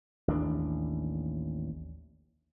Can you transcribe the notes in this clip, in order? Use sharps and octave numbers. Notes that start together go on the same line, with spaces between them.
A1 D#2 D4